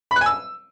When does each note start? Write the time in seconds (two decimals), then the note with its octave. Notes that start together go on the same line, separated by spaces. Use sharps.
0.11 B5
0.16 F#6
0.21 G#5
0.26 E6